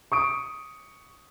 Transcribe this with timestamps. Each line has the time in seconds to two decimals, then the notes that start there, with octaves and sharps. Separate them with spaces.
0.12 C#6 D#6 D7